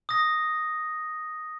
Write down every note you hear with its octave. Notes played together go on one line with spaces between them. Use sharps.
D#6 A#6